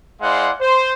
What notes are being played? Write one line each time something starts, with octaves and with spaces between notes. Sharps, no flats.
G#3 E4 C5 D5 F5 F#5
C5